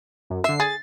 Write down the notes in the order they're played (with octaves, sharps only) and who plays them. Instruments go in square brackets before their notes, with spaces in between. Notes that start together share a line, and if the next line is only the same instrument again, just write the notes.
[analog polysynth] F#2
[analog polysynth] D3 C7 [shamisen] E5
[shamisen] G#4 [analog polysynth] A6